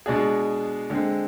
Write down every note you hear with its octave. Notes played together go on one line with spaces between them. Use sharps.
B2 G#3 D4 G#4
D3 G#3 C4